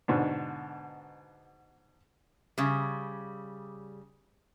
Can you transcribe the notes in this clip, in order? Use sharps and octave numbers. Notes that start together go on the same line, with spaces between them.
G#2 B2 D3 D4
C#3 G3